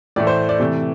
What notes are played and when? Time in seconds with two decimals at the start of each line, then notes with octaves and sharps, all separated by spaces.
0.16 A2 E3 A3 D5
0.27 C5
0.49 D5
0.60 C3 E3 A3